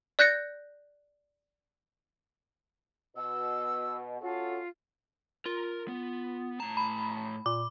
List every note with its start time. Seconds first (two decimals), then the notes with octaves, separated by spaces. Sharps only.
0.19 D5 F#6 G6 A#6 C#7
3.16 B2 E6
4.21 C#4 F4 F#4 A4
5.46 F4 A#4
5.88 B3
6.60 A2 A5 A#5
6.77 B5
7.46 A#2 D6